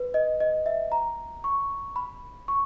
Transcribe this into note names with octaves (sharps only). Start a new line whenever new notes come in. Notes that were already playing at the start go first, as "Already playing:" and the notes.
Already playing: B4
D#5
D#5
E5
A#5
C#6
B5
C#6